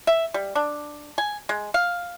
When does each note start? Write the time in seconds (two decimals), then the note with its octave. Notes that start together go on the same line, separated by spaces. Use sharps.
0.07 E5
0.34 G3
0.55 D4
1.18 G#5
1.49 G#3
1.74 F5